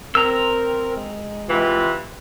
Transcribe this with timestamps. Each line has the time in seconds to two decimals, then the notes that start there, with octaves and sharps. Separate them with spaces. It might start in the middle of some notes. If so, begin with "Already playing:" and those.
0.15 C4 A#4 A#5 E6
0.97 G#3
1.48 C3 E3 F4